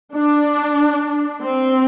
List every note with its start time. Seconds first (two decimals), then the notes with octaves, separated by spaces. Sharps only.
0.14 D4
1.43 C4